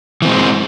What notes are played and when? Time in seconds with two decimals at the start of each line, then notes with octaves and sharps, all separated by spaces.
0.22 E3
0.25 C4
0.28 G#3